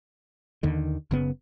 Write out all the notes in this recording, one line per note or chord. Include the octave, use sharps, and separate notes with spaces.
D#2 D3 D#3
F#1 C#3 B3